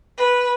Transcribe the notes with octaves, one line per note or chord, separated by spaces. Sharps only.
B4